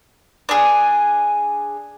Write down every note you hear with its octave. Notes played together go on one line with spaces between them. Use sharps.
D4 G#4